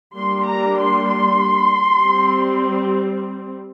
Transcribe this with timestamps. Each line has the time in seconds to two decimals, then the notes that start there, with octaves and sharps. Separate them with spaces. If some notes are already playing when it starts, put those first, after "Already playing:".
0.16 G3 A#3 D4 C6
0.46 A#5
0.78 C6
1.08 C6
2.02 G3 C4